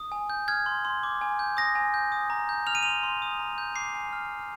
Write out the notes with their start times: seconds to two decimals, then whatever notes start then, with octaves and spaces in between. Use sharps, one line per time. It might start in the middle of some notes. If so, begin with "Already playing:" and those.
Already playing: D#6
0.12 G#5
0.30 G6
0.48 F6 G#6
0.66 C6
0.85 C6
1.03 D6
1.21 G#5
1.39 G6
1.57 D#6 A#6
1.75 G#5
1.94 G6
2.12 D#6
2.30 A#5
2.49 G6
2.67 F6 F7
2.75 D#7
2.83 C6 F7
3.03 C6
3.22 D#6
3.39 A#5
3.58 G6
3.76 D6 C7
3.95 G#5
4.13 F6
4.31 F6